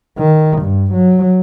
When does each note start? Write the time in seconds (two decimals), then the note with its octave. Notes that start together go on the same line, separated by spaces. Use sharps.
0.18 D#3
0.62 G2
0.93 F#3